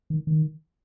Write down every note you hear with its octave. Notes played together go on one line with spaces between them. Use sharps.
D#3
D#3